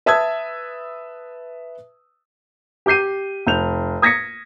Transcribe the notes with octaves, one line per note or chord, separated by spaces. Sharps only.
B4 E5 A5 D#6 E6 G#6
G4 D6 G6 C7 D#7
F1 G6 F7
D#6 G#6 A#6 B6 C#7